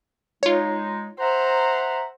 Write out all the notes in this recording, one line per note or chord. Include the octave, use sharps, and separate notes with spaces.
G#3 D#4 F4 C#5
C5 E5 F#5 A#5